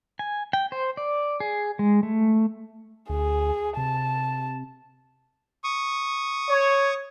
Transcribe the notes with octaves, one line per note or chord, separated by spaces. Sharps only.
G#5
G5
C5
D5
G#4
G#3
A3
D2 G#4
C3 A5
C#6 D#6
C#5